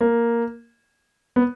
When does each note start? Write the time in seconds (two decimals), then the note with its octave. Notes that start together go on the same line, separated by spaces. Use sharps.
0.01 A#3
1.36 B3